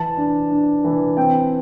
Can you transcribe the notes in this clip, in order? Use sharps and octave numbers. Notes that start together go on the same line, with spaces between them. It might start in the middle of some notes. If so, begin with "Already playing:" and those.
Already playing: E3 A5
D4
D4
E3
C4 G5